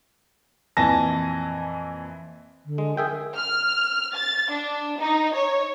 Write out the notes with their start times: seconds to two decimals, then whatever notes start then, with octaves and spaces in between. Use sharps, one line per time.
0.77 F2 A#2 E3 G#5 A5 A#6
2.66 D3
2.78 G#3
2.97 G#4 A#4 E5 G5
3.35 F6
4.14 A6
4.51 D4
5.00 D#4
5.35 C#5